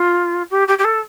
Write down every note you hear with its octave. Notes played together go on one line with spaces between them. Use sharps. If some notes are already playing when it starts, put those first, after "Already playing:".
Already playing: F4
G4
G4
G4
A4